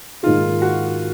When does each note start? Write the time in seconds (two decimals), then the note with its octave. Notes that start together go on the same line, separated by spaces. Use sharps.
0.23 G#2 D#3 A#3 D#4 F4 G#4
0.62 F#4